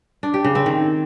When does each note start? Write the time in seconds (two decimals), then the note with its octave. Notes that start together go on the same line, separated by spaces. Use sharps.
0.23 D4
0.34 G4
0.44 C#3
0.55 C4
0.66 D#3